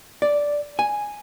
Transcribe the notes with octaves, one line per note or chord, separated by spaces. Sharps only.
D5
G#5